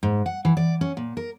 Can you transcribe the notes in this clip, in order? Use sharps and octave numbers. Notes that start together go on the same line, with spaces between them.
G#2
F#5
E3
D5
C#4
A#2
A#4